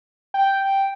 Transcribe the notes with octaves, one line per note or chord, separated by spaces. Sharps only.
G5